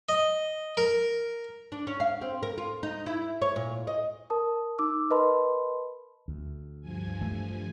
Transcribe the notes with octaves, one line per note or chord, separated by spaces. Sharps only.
D#5
A#4
D4
C#4
F5
C4
A#4
F4
D#4
E4
C#5
A#2
D#5
A#4 A5 D#6
D#4 D6 E6
A#4 B4 D#5 A5 B5 C6
D2
G2 F3 G#5
E3 A3